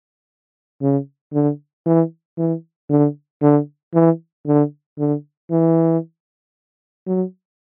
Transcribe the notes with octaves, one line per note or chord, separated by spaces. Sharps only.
C#3
D3
E3
E3
D3
D3
E3
D3
D3
E3
F#3